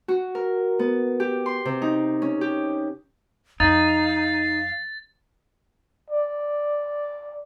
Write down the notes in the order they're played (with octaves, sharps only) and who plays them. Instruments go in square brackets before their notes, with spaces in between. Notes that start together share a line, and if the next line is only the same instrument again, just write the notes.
[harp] F#4
A#4
B3
G4
C6
C3
D#4
C#4
G4
[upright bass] F2 [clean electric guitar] D#4 [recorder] F5 [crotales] A6
[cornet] D5